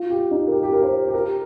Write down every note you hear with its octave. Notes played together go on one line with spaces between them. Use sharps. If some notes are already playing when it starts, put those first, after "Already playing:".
Already playing: F4
G4
D#4
A#4
G4
G4
A#4
C5
G4
A#4